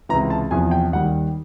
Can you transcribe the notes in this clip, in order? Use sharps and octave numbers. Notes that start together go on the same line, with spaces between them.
C#2 C3 E3 A#5
A5
E2 C3 F3 G#5
G5
D#2 D#3 G3 F#5